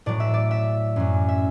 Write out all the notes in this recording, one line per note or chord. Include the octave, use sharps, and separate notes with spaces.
A2 F#3 D5
E5
D5
E5
F#2 F#3
E5